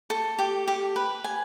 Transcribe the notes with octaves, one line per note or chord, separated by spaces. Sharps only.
A4
G4
G4
B4
G#5